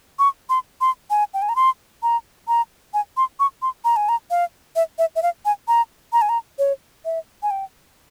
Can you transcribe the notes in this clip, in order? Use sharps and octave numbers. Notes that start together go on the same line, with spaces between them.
C#6
C6
C6
G#5
G5
G#5
A#5
C6
A#5
A#5
G#5
C6
C#6
C6
A#5
G#5
A#5
F5
E5
E5
E5
F5
G#5
A#5
A#5
G#5
A#5
C#5
E5
G#5
G5